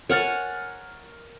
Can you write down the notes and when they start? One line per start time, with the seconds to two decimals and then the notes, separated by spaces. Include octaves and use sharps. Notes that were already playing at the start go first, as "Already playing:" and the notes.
0.09 A#4 C#5 F#5 G#5 F6 A6